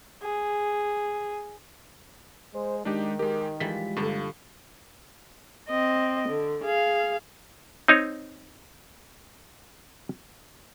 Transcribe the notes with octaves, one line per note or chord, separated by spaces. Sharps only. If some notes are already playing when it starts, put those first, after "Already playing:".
G#4
G#3 C5
D#3 G#3 D4 D#4 G4
G#3 G4 A#4
E3 F3 G3 G#3 B6
G2 D3 A#3
C4 D#5
D3
G#4 F5
C4 D#4 C#5